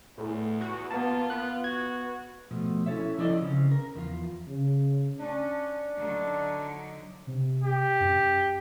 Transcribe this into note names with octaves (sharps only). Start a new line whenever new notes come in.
E2 A2
F#4
A#3 B3 F4 A5
B3 F#6
F#4 G#6
B2 F3 A3
C#4 E4 A4 C#5 E5
F3 E4 A4 D5 D#5
C#3 C4 C#4
A#4
E2 F3 F4
C#3
C#4 D4
D3 F#3 D#4
C3
G4
F#2